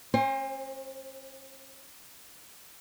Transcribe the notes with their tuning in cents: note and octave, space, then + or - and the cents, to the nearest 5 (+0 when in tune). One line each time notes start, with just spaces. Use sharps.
C#4 -45 C5 +20